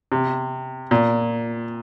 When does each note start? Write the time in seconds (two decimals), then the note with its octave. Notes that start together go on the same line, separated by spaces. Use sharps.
0.12 C3
0.91 A#2